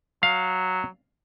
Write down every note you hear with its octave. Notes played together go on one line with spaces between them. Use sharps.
F#3 F5